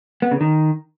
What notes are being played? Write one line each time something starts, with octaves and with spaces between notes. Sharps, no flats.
B3
C#3
D#3